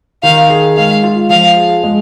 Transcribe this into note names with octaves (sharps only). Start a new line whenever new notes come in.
D#3 F5
G#4
G#3 F5
F4
F3 F5
G#4
G#3